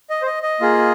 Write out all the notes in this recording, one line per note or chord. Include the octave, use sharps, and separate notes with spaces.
D#5
C5
D#5
D#5
A#3 F4 G#4